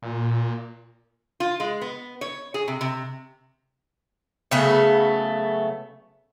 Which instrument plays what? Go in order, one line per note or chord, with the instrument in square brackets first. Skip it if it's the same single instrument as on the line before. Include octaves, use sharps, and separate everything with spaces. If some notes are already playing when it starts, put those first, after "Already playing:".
[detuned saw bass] A#2
[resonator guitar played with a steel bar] F4
G#3
B3
C#5
G#4
C3
C3
[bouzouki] C#3 F#3 A3 B3